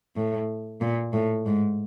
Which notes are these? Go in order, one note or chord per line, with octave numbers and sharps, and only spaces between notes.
A2
A#2
A2
G#2